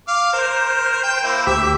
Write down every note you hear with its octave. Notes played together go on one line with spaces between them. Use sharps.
F5 D6
A#4 C5
G5
A#3 E4
D2 G4 E5